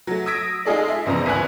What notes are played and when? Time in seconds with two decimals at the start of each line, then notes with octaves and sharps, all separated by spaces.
0.07 F#3 A3
0.26 D#6 E6 G#6 A#6 B6 D7
0.65 G#3 D#4 F4 G#4 A4 D5
0.89 E5
1.05 F1 A#1 E2 C#3 F3 A#5
1.26 G#1 D2 B4 G#5 F#6